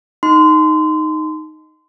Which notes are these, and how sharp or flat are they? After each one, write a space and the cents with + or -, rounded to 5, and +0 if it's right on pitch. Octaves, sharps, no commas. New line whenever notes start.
D#4 +0 C6 -25